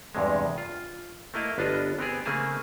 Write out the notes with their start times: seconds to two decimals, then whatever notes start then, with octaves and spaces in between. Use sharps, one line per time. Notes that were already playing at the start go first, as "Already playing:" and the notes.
0.15 E2 G2 C3 G#3
0.58 F4
1.34 A3 A#3 E4 D#5 F5
1.58 G1 B3 D4 F4 D#5 A5
1.99 B3 C4 G4 G#4
2.25 C#3 A3 A#3 C4 G#4 A5